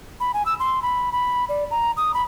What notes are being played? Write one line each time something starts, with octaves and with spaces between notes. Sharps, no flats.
B5
G#5
E6
C6
B5
B5
D5
A#5
D#6
B5